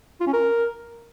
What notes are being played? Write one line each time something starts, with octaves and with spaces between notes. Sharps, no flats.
F4
C#4
A#4